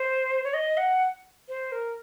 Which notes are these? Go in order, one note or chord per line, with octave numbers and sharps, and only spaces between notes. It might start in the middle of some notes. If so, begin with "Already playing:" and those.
Already playing: C5
C#5
D#5
F#5
C5
A#4